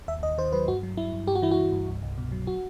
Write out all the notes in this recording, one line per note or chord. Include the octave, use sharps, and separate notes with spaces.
D#2 E5
D#2 D#5
D#3 C5
F#3 B4
G2 F#4
F#3
F#3 E4
G2
G2 G4
F#4
E3 E4
F#4
E3
G2
C2
C2
B2
F#3
F#4